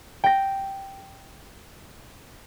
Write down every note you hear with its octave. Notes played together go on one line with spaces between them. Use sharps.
G5 A#6